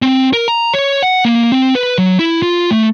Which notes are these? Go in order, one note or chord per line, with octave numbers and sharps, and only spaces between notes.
C4
A#4
A#5
C#5
F#5
A#3
C4
B4
F#3
E4
F4
A3